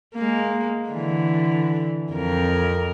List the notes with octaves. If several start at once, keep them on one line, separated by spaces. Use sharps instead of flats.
G#3 A#3
D3 E3
F2 A#4